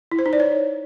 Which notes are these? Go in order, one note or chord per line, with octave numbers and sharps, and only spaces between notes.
E4
C5
D#4
D5
C#5